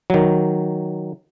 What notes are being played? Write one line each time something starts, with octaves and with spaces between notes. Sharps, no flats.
D#3 F#3